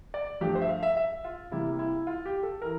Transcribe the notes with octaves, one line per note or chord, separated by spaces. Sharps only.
D5
G2 F3 A3 G4
C5
E5
F5
E5
E5
F4
C3 G3 A#3 E4
E4
F4
G4
A4
E3 A#4